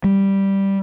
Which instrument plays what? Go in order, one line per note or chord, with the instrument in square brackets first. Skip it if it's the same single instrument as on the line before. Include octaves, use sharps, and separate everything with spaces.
[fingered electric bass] G3